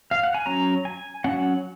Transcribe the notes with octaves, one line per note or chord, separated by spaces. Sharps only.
F5
F#5
G#5
F#3 C#4 A#5
G#5
F#3 C#4 F#5